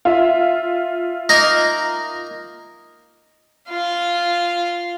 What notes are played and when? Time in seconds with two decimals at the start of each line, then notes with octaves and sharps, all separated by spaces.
0.05 F4 E5
1.29 A#3 D#4 A#4
3.70 F4 F5